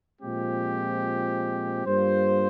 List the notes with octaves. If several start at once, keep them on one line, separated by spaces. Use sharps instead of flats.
A#2 F3 G#3 C4 G4
G2 G3 A#3 F4 C5